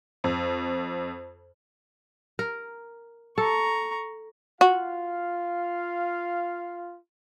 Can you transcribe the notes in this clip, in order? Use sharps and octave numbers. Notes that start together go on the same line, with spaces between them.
F2
A#4
A4 A#5 C#6
F4 F#4 F5